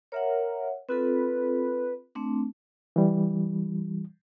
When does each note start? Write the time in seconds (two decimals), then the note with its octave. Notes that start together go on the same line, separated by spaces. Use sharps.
0.12 A#4 C#5 E5 F#5
0.89 C4 F4 A4 B4
2.15 A3 C4 D4
2.96 E3 G3